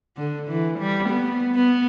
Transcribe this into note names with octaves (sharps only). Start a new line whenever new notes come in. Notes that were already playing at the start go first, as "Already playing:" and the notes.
D3
E3
G3
B3
B3